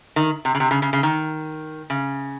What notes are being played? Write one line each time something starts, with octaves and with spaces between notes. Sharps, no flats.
D#3
C3
C#3
C3
C#3
C#3
C#3
D#3
C#3